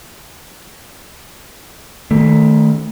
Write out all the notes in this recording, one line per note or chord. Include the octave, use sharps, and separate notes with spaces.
D#3 A3